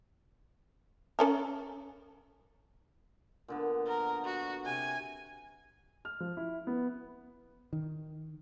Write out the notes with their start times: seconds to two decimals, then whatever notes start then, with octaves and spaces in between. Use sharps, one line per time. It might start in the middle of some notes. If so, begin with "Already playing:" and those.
1.19 C#4 A4 A#4
3.48 A#2 D3 B3
3.87 A#4
4.24 F#4
4.65 C3 F#5 G#5
6.05 F6
6.20 F3
6.37 E4
6.67 B3
7.73 D#3